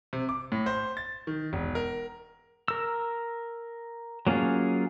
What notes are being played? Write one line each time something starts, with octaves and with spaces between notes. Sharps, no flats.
C3
D6
A2
C5
A6
D#3
E1
A#4
A#4 E6
F#3 A#3 C#4 F4 G#4